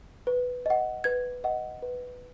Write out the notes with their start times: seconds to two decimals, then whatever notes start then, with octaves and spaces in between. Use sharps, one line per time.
0.27 B4
0.66 D#5 F#5
1.04 B4 G#6
1.44 D#5 F#5
1.82 B4